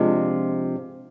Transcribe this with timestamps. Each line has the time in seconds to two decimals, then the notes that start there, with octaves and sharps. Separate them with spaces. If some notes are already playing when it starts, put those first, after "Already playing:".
Already playing: C3 F3 G#3 D4 F4